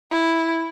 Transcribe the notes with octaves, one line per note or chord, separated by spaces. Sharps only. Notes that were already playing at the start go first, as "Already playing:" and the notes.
E4